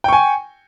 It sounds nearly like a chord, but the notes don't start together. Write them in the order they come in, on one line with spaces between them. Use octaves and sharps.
G5 C#6 G#5